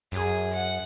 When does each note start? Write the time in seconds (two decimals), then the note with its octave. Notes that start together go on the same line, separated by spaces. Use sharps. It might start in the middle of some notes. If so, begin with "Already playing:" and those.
0.12 F#2 G#4
0.53 F#5